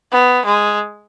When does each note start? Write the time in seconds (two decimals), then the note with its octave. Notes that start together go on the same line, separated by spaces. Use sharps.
0.11 B3
0.45 G#3